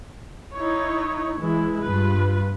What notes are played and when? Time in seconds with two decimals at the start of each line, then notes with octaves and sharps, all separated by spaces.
0.54 D#4 E4 C#5
1.39 E3 G#3 E4
1.84 G2 F4 B4